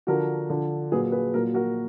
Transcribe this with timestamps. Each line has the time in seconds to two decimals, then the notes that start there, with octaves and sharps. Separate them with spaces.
0.07 D3 F3 F#4 A#4
0.50 D3 F3
0.92 A#2 F#3 G#4 B4
1.12 G#4 B4
1.34 A#2 F#3 F#4 A#4
1.54 F#4 A#4